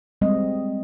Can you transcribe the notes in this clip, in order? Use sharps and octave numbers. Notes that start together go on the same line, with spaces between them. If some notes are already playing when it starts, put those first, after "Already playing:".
G3 G#3 C4 D#5